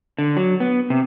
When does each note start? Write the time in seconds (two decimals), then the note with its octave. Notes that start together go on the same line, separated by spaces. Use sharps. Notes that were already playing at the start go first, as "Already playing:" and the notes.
0.18 D3
0.37 F#3
0.60 B3
0.90 C3